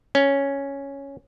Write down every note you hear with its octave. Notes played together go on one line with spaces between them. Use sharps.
C#4